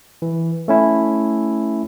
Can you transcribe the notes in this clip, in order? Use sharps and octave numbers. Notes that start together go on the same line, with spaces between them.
E3
A3 C#4 E4